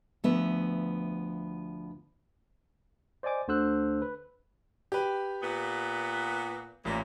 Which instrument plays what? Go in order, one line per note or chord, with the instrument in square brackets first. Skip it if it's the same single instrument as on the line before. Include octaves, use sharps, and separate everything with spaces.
[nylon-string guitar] D2 F3 B3 B4 E5
[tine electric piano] C5 D5 D#5 G#5 D6
D2 D3 C5 E6 F#6
B4
[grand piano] G4 B4
[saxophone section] A#2 B3
[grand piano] A1 [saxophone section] A#2